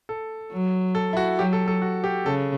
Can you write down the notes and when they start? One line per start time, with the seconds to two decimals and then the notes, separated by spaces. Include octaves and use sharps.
0.09 A4
0.52 F#3
0.95 A4
1.13 E4
1.17 F#4
1.38 F#3 G4
1.53 A4
1.68 A4
1.82 F#4
2.04 G4
2.26 C#3 A4